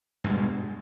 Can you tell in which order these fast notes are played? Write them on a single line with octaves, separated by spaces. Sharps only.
G2 G#3 B2